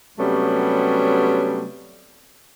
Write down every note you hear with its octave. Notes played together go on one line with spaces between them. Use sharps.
C3 F#3 G3 A3 B3 C#4